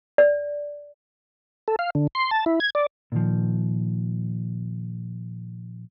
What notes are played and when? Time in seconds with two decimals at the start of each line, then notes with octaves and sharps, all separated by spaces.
0.18 D5
1.68 A4
1.79 F5
1.95 D3
2.15 C6
2.31 A5
2.46 E4
2.60 G#6
2.75 D5
3.12 A#2 D#3 F3